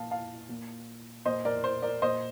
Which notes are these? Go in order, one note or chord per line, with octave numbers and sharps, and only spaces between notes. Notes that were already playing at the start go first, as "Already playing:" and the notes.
Already playing: A#2 F5 A5
F5 A5
A#2
A#2 C5 D#5
A#4 D5
C5
A#4 D5
A#2 C5 D#5